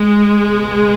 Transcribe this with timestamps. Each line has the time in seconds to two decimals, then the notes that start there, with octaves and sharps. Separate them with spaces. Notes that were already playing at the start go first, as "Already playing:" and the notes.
Already playing: G#3
0.43 C#2 B2